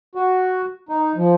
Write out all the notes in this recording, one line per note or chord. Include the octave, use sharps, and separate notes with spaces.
F#4
D#4
F3